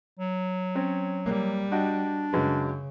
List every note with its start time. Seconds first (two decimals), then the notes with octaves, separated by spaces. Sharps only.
0.19 F#3
0.75 C4 C#4
1.26 G3 A#3
1.72 D4 F#4 D#5 G5
2.33 F#2 C#3 G#3 B4